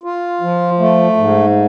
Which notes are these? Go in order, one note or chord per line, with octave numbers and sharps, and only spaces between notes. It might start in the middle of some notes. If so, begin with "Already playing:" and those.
F4
F3
A3
G#2